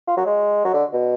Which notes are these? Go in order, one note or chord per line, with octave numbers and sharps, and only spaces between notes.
F4
F#3
G#3
F#3
D3
B2